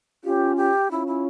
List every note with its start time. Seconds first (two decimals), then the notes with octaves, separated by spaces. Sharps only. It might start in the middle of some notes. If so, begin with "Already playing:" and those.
0.24 C#4 F4 G4
0.57 G4
0.90 C#4 E4 F4
1.07 E4